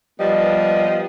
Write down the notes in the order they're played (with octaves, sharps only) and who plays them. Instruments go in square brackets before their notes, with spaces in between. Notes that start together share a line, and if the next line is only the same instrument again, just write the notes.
[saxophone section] F3 G3 B3 B4 D#5